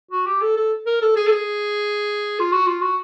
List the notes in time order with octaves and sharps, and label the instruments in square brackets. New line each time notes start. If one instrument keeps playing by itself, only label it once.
[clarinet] F#4
G4
A4
A4
A#4
A4
G#4
A4
G#4
F4
F#4
F4
F#4